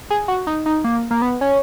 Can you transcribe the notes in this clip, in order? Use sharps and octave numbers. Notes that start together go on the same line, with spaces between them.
G#4
F#4
D#4
D#4
A#3
A#3
B3
C#4